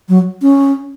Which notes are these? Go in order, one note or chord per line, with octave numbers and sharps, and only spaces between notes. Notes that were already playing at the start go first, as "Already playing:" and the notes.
F#3
C#4